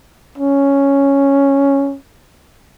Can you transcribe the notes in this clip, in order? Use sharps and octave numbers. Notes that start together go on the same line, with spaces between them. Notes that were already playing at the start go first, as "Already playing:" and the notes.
C#4